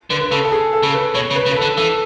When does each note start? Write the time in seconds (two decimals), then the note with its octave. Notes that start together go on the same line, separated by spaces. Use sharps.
0.10 D3 B4
0.21 B4
0.31 C#3 A4
0.45 A4
0.52 G#4
0.73 A4
0.83 C#3
0.94 B4
1.14 B2 C#5
1.30 C#3
1.35 B4
1.46 C#3
1.51 B4
1.56 A4
1.62 D3
1.77 E3 A4